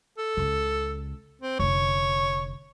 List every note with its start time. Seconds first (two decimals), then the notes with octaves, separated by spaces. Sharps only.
0.18 A4
0.37 C#2 C#3
1.42 C4
1.59 F1 D3 C#5